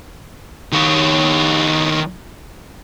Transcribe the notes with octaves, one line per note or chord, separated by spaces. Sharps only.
D#3 C#5